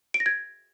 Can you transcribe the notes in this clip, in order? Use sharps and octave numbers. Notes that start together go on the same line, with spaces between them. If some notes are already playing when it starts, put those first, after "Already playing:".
D7
A#6
G#6